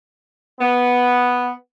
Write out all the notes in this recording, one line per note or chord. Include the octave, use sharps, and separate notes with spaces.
B3